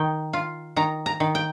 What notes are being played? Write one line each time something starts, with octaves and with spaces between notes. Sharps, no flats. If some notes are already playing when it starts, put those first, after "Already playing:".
Already playing: D#3 G5
F4
D#3 A#5
A#5
D#3
G5